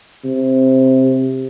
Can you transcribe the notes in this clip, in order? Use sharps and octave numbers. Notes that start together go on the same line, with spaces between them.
C3